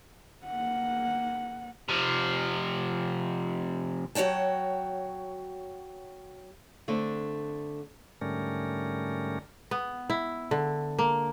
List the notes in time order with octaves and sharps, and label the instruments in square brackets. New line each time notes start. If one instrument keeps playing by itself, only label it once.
[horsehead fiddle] A#3 F#5
[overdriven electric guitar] C3 F3
[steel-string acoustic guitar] F#3 F#4 C#5 G5 A5
[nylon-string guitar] D3 A3 C4 D4
[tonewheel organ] G#2 D3 G3 A3 C#4 A#4
[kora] B3
E4
D3
A#3